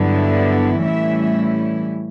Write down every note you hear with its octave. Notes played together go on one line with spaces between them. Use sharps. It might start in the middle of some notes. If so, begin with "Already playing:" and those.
Already playing: G2 D3 F#3 B3 E4
D5
A2 E3 G3 C#4 E4 E5